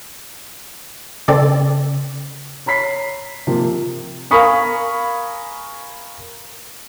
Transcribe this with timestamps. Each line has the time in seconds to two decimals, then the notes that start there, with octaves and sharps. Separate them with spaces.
1.28 C#3 C4 A4 D5
2.66 C#5 A#5 B5 B6 C7
3.47 C3 F3 A#3
4.31 A#4 F5 G#5 B5 C#6 D#6